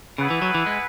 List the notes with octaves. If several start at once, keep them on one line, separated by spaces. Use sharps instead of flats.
C#3 B3 E4 G#4 B4 F#5
E3
F#3
E3
G#3